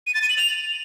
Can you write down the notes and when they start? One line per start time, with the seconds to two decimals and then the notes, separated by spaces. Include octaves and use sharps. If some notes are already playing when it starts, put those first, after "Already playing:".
0.07 D#7
0.14 A6
0.22 D#7
0.30 F#7
0.37 F7